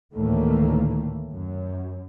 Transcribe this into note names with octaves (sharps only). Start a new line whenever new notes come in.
D2 A2 D#3 E3 A3 A#3
F#2